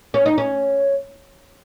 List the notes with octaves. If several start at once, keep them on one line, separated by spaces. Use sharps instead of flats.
C#4
D#4
C#4